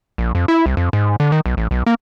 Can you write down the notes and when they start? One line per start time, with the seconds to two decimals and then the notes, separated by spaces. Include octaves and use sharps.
0.18 A#1
0.35 F2
0.48 E4
0.66 C2
0.77 F2
0.93 G#2
1.20 D3
1.32 D#3
1.46 B1
1.57 A1
1.71 B1
1.86 A#3